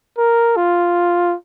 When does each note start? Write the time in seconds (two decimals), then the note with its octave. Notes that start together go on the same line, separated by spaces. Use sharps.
0.18 A#4
0.56 F4